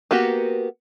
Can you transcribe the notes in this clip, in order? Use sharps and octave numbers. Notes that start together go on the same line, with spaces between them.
A#3 B3 F#4 G4